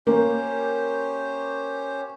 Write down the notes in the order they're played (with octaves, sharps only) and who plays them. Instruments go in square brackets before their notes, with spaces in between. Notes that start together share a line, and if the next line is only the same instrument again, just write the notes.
[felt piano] A#3 [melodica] C#4 G4 C5